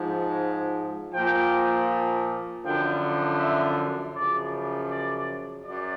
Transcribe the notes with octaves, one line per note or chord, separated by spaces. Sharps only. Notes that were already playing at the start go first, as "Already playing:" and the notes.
Already playing: G#2 F3
A#2 F3 G5
F#2 D3 F3 G5
E5
F#2 C#3 F3 D5
D5
F#2 D5